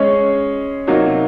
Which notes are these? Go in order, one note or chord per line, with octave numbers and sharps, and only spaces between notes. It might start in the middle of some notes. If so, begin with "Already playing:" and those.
Already playing: G#3 C#4 G#4 C#5
C3 F#3 A#3 D#4 F#4